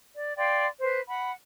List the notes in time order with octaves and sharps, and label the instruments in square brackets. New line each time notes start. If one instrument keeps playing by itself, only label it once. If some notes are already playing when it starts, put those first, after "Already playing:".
[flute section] D5
D5 F5 G5 C6
B4 C5
F#5 B5